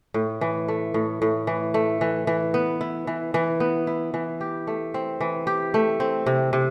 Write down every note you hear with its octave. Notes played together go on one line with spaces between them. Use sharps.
A2
E3
A3
A2
A2
E3
A3
E3
E3
B3
E4
E3
E3
B3
E4
E3
G4
A3
C4
E3
G4
A3
C4
C3
C3